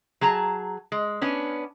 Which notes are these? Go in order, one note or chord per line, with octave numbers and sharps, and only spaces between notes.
F#3 G#4 A5 A#5
G#3
B3 C#4 D4